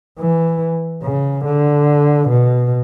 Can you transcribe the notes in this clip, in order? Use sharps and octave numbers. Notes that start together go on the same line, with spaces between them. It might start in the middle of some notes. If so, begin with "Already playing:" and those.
E3
C#3
D3
B2